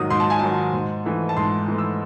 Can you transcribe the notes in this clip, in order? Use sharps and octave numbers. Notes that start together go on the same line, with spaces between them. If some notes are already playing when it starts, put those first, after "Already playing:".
Already playing: G#2 D#3 F#3 D#6
G#2 C6
A5
G#5
D#3 F#3 A5
G#2
E3 A3
A5
G#2 C6
E3 A3
E6